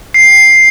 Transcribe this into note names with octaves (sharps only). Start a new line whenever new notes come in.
C7